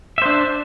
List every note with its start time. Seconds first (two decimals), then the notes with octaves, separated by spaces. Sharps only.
0.18 E5
0.22 C5
0.26 D4